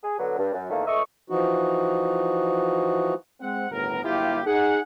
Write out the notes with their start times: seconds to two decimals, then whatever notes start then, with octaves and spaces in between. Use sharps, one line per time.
0.03 G#4
0.18 D3 F#3 B3
0.37 G2
0.52 F#2
0.70 E2 A#2 D#3 A3 A#3
0.87 C#2 A3 D#5 E5 C#6
1.30 E3 F3 D#4 F#4
3.41 G#3 C4 F#5
3.71 G1 D#2 A2 B3 A#4
4.04 G1 F#3 A#3 E4 F4 G4
4.47 D#4 G#4 F#5